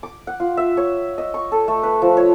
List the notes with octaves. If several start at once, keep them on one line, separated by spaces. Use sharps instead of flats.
D6
F#5
F4
E5
C#5
D#5
C#6
A4
A3
B4
F3
C#5